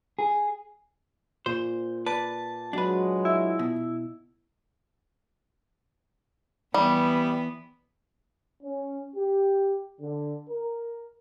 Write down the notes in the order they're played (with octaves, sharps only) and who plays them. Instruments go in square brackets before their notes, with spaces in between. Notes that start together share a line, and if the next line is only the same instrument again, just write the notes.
[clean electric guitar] G#4
[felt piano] A#2 [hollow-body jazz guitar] C5
[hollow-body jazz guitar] B4 D5 [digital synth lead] A5
[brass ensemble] F#3 G#3 F#4 [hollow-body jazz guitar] D4 B4
[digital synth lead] E4
[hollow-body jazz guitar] B2
[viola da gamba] E3 B3 [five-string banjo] G3
[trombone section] C#4
G4
D3
A#4